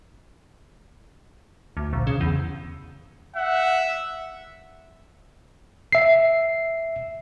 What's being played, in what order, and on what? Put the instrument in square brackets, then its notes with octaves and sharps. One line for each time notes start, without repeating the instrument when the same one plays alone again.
[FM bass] D2
A#1
C#3
E2
[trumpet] E5 [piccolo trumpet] F#5
[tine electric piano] E5 C7